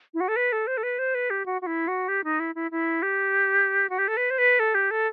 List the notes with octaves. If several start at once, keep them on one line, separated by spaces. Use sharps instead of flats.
E4
F#4
A4
B4
A4
C5
A4
B4
C5
B4
G4
F#4
F#4
E4
F#4
G4
D#4
E4
E4
E4
G4
F#4
G4
A4
B4
C5
B4
A4
G4
A4